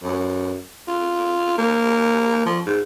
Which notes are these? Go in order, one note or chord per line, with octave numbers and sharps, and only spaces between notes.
F#2
F4
A#3
F3
G#2